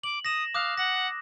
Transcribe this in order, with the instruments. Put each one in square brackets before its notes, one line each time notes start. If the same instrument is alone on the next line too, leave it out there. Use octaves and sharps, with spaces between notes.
[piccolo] D6 [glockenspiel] F#7
[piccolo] D#6 [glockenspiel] A#6 E7
[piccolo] F5 [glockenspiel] D6 D#6 F#6
[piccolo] F#5 [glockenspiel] A#6